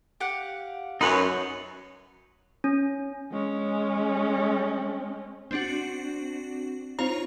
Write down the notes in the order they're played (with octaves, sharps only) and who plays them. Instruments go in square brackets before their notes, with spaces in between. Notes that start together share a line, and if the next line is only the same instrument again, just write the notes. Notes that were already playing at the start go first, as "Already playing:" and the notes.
[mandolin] G4 F5 F#5
[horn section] F#2 [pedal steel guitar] D#4 B4 C#5 [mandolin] B5 C6
[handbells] C#4
[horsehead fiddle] G#3 C#4
[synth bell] C4 D4 F#4
[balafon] C4 D#4 C5 [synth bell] F4 C#5 A#5